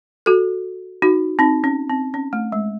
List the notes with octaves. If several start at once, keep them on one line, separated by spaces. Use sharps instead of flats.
F#4 A4
D#4 F#4
C4 D#4
C#4
C4
C#4
A3
G#3